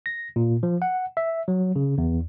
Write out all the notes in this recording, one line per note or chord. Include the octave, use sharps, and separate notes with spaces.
A#6
A#2
F3
F#5
E5
F#3
C#3
E2